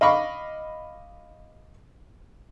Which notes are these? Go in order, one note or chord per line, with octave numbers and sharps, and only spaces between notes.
D#5 F5 B5 C#6 D6